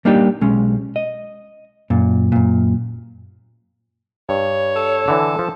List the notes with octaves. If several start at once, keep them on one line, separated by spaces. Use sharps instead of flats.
G3 A#3 D4 D#4 G4
B1 G#3 C#4
D#5
F#2 A#2
F#2 A#2
G2 C#5
A4
D3 E3
F3